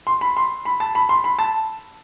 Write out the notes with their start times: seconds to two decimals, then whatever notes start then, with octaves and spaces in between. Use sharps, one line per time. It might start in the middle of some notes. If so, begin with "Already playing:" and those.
0.07 C6
0.21 B5
0.37 C6
0.65 B5
0.80 A5
0.95 B5
1.09 C6
1.24 B5
1.39 A5